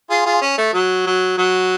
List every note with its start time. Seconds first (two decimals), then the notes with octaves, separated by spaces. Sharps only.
0.10 F4 G#4
0.26 F4 G#4
0.41 C#4
0.58 A3
0.73 F#3
1.06 F#3
1.38 F#3